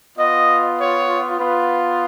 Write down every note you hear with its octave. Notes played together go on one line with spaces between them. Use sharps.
B3 F4 D#5
C#5
B3 F4 B4